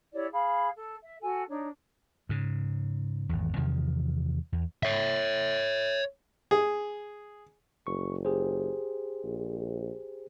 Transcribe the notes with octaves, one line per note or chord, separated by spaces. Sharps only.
E4 G4 C#5 D5
G#4 F5 B5
A4
E5
F#4 A4 G#5
D4 D#4 C#5
G#2 C#3
G#1 E2
E2 C3 D#3 F3
E2
C#5 E5
G#4
F#1 C#6
G4 G#4 C5
A#1